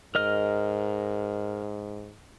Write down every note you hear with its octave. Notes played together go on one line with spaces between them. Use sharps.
G#2 A#4 D#5 F6